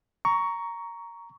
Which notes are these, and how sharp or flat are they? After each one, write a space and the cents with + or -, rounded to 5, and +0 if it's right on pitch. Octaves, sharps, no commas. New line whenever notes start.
A#5 +0 C#6 +15